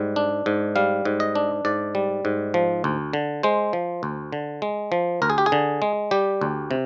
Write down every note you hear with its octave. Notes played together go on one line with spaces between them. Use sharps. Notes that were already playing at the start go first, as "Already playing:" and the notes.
Already playing: G#2 G3
D4
G#2
G3 F5
G#2
D#5
D4
G#2 D5
G3
G#2
F3
D2
D3
G#3 C5
F3
D2
D3
G#3
F3
D2 A#4
G#4
G4
G#4
D3
G#3
G3 G4
D2
C3